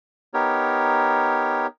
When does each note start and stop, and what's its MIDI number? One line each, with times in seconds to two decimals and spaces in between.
0.34 1.67 59
0.34 1.67 63
0.34 1.67 67
0.34 1.67 70
0.34 1.67 73